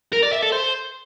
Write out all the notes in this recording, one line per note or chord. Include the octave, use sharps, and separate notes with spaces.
A#4
D5
E5
A4
C5